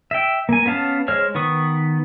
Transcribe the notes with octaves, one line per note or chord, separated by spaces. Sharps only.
E5 G5
A#3 G#5
B3 C#4 F5 A5
G#3 C5 C#5 F6
D#3 B3 B4 C#6 D#6